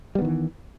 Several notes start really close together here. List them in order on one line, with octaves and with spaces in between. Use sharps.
G3 B3 D#3 E3